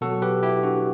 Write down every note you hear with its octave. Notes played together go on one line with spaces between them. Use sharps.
B2 F#3 F#4 A4
G4 B4
E4 G4
D4 F#4